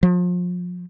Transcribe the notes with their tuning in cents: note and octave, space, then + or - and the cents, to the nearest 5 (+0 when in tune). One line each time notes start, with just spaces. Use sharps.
F3 +35